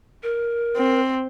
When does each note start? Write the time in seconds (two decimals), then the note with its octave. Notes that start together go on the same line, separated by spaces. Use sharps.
0.23 A#4
0.77 C4